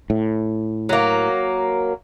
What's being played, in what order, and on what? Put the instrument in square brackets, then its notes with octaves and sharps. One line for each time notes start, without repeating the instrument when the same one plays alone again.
[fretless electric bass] A2
[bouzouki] F#3 A#3